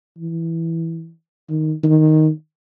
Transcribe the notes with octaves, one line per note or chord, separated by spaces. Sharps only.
E3
D#3
D#3